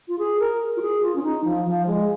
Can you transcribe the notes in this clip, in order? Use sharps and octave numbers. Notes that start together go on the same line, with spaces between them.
F4
G#4
A#4
F4
G#4
F4
C#4
D#4
F3
F3
G#3